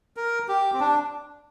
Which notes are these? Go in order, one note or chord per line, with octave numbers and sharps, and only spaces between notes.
A#4
G4
C4
D4